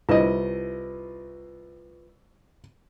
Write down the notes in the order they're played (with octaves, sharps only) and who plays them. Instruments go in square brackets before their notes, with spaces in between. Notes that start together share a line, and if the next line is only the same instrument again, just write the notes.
[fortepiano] C2 E4 D#5 [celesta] F4 B4